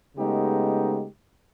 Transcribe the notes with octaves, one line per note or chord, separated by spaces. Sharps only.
C#3 G#3 A3 B3 D#4 G4